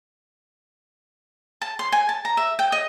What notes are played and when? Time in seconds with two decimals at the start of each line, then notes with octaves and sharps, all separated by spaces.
1.62 A5
1.79 C6
1.92 G#5
2.09 A5
2.25 A#5
2.37 E5
2.59 G5
2.72 D#5